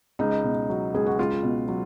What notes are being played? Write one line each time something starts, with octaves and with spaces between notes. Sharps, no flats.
C#2 D#4
B2
F#3
C#2 G#4
F#4
C#2 F4
B2
F#3